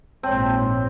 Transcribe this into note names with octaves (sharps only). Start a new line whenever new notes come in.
A#1 G#2 C4 C#5 A5